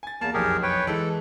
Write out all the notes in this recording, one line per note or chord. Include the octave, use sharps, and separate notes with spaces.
G#5 A6
E2 A#3 A5
F#1 B1 F2 G4 G#4 A#4
B4 C#5 G5
E3 G#3 A4